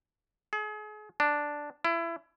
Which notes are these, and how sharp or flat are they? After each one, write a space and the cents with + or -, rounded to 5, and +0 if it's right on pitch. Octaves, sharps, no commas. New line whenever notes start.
G#4 +35
D4 +0
E4 +25